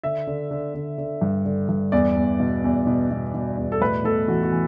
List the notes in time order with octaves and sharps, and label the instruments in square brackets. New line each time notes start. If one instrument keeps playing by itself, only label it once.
[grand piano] D3 E5
D3
D3
D3
D3
G2
D3
G2
E2 D5
E2
B2
E2
B2
B2
B2
E2
A4
A2 B4
A2 A4
E3 F#4
F#4
E3